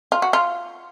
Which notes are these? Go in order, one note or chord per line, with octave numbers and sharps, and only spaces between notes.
F4
F#4
F4